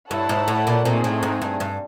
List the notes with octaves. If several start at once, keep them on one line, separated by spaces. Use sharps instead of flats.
G2 E4 A4 C#5 F#5 A5
G#2
A2
A#2
A#2 A3 C4 D#4 G#4
A2
G#2
G2
G2